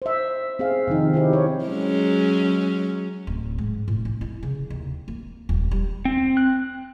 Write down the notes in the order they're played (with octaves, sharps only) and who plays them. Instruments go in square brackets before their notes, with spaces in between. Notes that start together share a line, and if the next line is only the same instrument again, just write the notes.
[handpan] C5 E5
C4 G#4 F5
C3 D#3 F3 D#4
C4 E4 G4
C4 C#5
[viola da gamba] F#3 G#3 C#4
[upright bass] D1
G#2
A2
D#4
E4
C#3
D#2
A#3
D#1
G3
[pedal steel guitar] C4
F#6